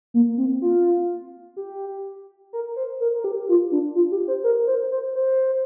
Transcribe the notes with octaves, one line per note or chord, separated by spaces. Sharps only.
A#3
C4
F4
G4
A#4
C5
A#4
A#4
G4
F4
D4
F4
G4
C5
A#4
C5
C5
C5